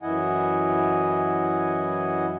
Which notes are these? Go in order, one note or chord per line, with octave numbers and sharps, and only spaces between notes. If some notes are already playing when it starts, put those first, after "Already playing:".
F#2 E3 E4 D#5 F#5 G#5